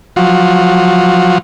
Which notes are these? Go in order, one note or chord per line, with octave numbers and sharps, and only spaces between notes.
F3 F#3